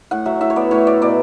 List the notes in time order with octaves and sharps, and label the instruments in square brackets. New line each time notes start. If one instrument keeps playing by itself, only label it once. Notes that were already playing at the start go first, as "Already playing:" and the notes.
[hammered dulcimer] A2 F#5
F#3 E5
A2 E5
C#5
B3 D5
A2 C#5
F#3 D5
B2 D5